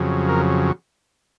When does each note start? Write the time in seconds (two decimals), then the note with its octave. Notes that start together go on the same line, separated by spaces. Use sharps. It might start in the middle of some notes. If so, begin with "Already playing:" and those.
Already playing: F2 C#3 F#3
0.29 A#4